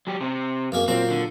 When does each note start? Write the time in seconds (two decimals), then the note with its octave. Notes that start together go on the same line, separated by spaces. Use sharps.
0.07 F#3 G4
0.21 C3 C4
0.72 F#2 A#3 G#4
0.88 A#2 F#3 C4 A#5
1.10 D3